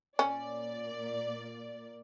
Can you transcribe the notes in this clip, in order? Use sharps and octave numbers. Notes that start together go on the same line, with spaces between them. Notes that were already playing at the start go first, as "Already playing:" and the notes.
A#2 A#3 C#4 D5